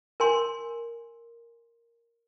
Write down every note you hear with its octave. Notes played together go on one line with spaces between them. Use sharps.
A#4 G#5 C6